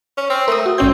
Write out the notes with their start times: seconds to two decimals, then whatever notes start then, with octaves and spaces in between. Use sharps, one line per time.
0.17 C#4
0.30 C4
0.48 A3 A#4 D#6
0.66 F#4
0.78 G#1 C4 C#4 G6